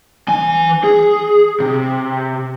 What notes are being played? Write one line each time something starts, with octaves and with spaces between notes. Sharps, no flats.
E3 G#5
G#4
C3